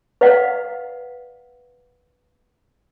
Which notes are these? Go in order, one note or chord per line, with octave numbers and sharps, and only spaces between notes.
B4 D5 D#5 F5 F#5